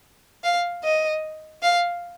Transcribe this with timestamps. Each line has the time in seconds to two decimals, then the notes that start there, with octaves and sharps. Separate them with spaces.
0.44 F5
0.84 D#5
1.63 F5